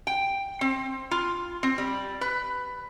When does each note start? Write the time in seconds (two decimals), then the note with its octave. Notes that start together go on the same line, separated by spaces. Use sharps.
0.07 G5
0.61 C4
1.11 F4
1.63 C4
1.78 G3
2.21 B4